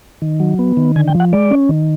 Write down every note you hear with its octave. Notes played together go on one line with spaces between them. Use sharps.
D#3
F#3
B3
D#3
D3 G#5
G5
F3
F#5
G#3 D5
C#4
D#3